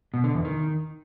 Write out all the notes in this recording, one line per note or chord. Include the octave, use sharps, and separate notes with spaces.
B2
D3
E2
D#3